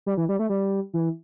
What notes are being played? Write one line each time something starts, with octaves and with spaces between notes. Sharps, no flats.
G3
E3
G3
A3
G3
E3